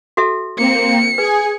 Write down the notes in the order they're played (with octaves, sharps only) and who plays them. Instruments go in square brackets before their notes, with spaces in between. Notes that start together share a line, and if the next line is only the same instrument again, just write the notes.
[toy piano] F#4 A4 E5
[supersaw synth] A#3 C4 [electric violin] C#7
[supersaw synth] G#4 G#5 [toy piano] B4